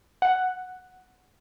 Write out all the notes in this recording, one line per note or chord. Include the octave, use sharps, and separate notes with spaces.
F#5